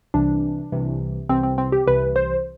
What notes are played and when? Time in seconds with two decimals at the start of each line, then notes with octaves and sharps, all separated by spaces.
0.14 C2 C3 E3 D4
0.72 C2 C3 E3
1.29 C2 C3 E3 C4
1.43 C4
1.58 C4
1.72 G4
1.86 C2 C3 E3 B4
2.16 C5